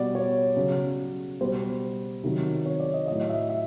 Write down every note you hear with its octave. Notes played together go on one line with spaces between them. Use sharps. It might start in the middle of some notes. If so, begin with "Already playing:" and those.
Already playing: B2 G3 D5
C#5
C#3 F#3
B2 G3 C5
C3 D#3 F#3
C#5
D5
D#5
A2 F#3 D#5
E5
E5